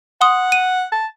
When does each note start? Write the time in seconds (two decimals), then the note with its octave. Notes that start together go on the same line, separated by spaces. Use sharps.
0.21 F#5 C6 D#6
0.52 D#7
0.92 A5